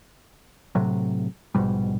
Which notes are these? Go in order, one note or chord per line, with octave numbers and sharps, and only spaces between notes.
A2 C3 F#3
A#1 G#2 B2 G3